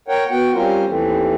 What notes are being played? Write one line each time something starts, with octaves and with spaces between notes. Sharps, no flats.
A#4 C#5 F#5 G5
B3 F#4 F#5 G5
G3 C4 C#4 F4 A#4 C5
D#2 E3 A3 C4